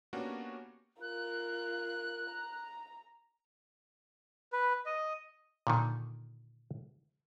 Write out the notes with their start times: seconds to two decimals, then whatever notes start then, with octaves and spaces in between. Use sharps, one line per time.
0.13 A#3 B3 C#4 D4 F#4 G4
1.01 F4 A#4 F#6
2.30 A#5
4.53 B4
4.86 D#5
5.67 A#2 D3 D#3